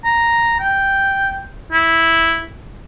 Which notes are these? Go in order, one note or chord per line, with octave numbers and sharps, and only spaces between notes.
A#5
G5
E4